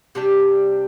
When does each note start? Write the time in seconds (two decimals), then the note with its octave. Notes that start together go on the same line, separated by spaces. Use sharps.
0.15 C3 G3 D4 G4